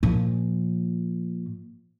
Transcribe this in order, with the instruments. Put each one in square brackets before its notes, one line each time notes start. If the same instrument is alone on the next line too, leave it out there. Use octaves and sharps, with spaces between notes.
[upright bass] A#2 F3